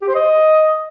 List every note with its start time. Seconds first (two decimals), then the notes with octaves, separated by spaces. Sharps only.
0.02 G4
0.08 C5
0.15 D#5